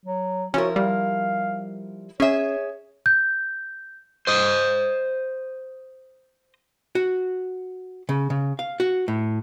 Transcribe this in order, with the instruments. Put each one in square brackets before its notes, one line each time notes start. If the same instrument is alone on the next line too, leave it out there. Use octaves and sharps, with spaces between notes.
[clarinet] F#3
[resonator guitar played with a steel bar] F3 E4 A#4 [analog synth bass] C#4 [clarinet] F#4
[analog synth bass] G3 [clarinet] F5
[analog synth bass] C#4 [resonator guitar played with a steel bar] G#4 E5 [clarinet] C#5
[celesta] G6
[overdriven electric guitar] C5 D#5
[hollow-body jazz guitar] F#4
C#3
C#3
F5
F#4
A2